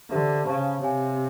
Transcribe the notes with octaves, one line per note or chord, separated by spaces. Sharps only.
D3 G4 C5 E5
C#3 C5 F5 A5 C#6
C3 C#5 F5 G#5